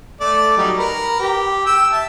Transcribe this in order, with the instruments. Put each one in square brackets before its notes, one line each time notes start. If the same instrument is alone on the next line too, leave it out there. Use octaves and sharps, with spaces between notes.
[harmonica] A3 D5
F#3 G3 D#4
A#4 B4
G4
G5 E6
E5 A5